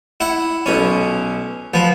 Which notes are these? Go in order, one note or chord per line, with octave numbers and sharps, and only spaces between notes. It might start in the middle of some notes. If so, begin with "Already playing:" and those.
E4 F#5
B1 C#4
F3 B3